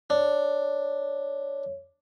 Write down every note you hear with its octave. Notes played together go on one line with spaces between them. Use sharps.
D4 C#5